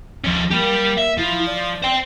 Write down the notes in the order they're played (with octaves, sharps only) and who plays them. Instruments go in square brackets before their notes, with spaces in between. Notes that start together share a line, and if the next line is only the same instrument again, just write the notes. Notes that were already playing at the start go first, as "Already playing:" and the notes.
[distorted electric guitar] F3 C#4
[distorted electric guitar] G3 G4 [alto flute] A#3
[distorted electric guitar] E5
[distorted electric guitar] F3 [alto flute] E4
[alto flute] D5
[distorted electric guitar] C5 G5